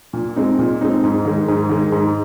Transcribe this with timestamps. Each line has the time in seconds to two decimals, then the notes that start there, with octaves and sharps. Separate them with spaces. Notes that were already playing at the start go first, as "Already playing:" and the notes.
0.13 A#2
0.36 G#3 C4 D#4
0.59 A#2
0.81 G#3 C4 D#4
1.04 G#2
1.25 D#3 G#3
1.48 G#2
1.69 D#3 G#3
1.92 G#2